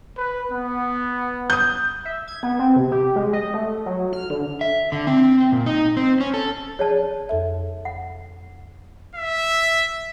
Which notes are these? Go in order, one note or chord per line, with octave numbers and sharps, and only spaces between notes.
B4
B3
D#6 G6
E5
G#6
B3
C4
C3
G4
G#3
D#5
A3
F#3
F6
D3
E5
D3
C4
A#2
D#4
C4
C#4
A4
G#4 C#5 D5 A5
F2 A4 E5
F#5
E5